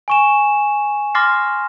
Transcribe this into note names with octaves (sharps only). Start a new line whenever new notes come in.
G#5 C#6 E7
C6 D6 F6 A6 A#6 C7